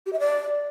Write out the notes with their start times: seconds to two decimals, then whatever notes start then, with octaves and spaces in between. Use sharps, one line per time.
0.06 G4
0.13 E5
0.20 D5